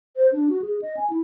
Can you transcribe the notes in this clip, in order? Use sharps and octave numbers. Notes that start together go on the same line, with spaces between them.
C5
D4
F#4
G#4
D#5
G#5
E4